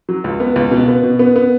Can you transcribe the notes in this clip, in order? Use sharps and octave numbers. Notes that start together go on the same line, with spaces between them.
F#3
C#2
B3
C#2
B2
B3
B2
B3
B3